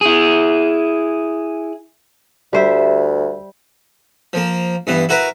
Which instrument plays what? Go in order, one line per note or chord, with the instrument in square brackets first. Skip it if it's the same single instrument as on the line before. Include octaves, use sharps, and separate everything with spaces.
[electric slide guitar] E4 G#4
[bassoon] D2 [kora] G3 C5 E5
[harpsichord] F3 A#3
G2 E3 B3
E4 F#4 A#4 B4